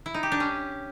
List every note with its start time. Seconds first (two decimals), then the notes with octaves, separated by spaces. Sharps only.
0.06 E4
0.14 D#4
0.23 G4
0.32 D4
0.40 C#4